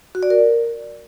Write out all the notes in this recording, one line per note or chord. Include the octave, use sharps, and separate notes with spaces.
F#4
D5
A#4